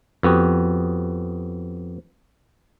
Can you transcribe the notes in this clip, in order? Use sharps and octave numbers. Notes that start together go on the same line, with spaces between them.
F2 B3 F#4 G4